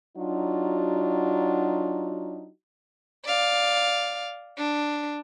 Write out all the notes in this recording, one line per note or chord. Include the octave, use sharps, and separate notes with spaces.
F#3 D4 D#4 F4 F#4
D5 F5
D4